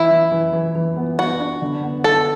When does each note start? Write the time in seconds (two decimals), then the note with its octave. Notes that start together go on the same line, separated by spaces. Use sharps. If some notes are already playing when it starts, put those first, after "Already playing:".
Already playing: E3 E4
0.11 E3
0.32 E3
0.53 E3
0.75 E3
0.96 B3
1.18 B3 F#4
1.40 D4
1.62 D3
1.83 B3
2.04 B3 A4